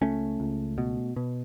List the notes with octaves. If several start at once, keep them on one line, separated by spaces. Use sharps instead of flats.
C#2 A3 C#4
C#2
B2
B2